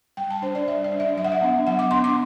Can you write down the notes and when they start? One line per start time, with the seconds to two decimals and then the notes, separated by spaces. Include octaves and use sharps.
0.17 G3 G5
0.30 A5
0.42 D4 C5
0.55 D5
0.68 G3 E5
0.84 D5
0.92 D4
1.00 E5
1.17 F#3 E5
1.25 F#5
1.32 E5
1.42 B3 D4
1.67 F#3 F#5
1.79 D6
1.91 B3 D4 C6
2.04 D6